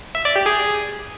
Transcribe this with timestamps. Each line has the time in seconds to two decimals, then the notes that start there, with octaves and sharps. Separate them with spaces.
0.15 E5
0.25 D5
0.36 G4
0.46 G#4